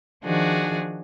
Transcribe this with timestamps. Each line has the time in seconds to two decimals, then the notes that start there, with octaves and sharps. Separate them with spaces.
0.24 D#3 F3 D4 F#4 G#4